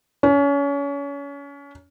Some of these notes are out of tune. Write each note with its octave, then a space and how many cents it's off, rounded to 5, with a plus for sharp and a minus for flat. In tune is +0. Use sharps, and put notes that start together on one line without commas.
C#4 +30